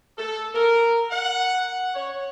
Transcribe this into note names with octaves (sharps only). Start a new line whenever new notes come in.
A4
A#4
F#5
C#5